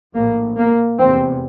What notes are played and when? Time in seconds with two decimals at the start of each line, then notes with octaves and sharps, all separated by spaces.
0.15 A#1 A2 A#3
0.57 A#3
0.98 F1 E2 C3 C4